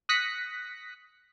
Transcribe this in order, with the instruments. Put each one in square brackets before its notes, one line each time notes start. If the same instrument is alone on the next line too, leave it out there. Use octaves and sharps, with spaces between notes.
[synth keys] D#6 F#6 A#6 B6 C#7